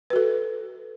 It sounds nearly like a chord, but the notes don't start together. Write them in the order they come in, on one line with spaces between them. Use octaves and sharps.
B4 F#4 A4